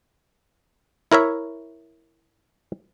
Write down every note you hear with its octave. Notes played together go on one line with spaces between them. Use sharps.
E4 A#4 C#5 E5